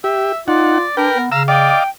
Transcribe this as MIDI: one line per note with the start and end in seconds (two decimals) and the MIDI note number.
0.04 0.32 67
0.04 0.39 76
0.48 0.78 63
0.48 0.85 65
0.48 0.95 74
0.48 0.78 78
0.97 1.09 62
0.97 1.22 70
0.97 1.18 71
0.97 1.18 79
1.16 1.29 59
1.32 1.73 49
1.32 1.43 77
1.32 1.43 82
1.32 1.43 88
1.48 1.78 74
1.48 1.84 75
1.48 1.84 77
1.48 1.89 79
1.48 1.84 86